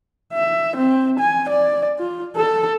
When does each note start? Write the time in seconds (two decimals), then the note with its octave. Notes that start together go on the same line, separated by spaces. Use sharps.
0.33 E5
0.76 C4
1.20 G#5
1.49 D5
1.99 F4
2.36 A4